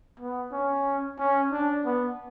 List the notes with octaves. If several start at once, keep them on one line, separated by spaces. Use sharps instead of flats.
B3
C#4
C#4
D4
B3